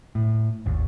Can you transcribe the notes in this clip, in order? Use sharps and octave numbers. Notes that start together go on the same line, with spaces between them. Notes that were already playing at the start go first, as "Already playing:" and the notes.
A2
G#1 D#2